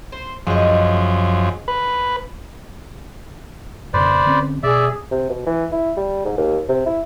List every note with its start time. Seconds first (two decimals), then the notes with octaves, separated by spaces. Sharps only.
0.12 C5
0.47 F#2 F3 G#3 D#5
1.68 B4
3.94 F2 A#2 C#3 B4 C5 D5
4.26 D3 C4 C#4
4.63 B2 G#4 D5 E5
5.11 C3
5.29 B2
5.47 E3
5.72 E4
5.97 G3
6.25 G#2
6.37 D#2
6.68 C3
6.86 E4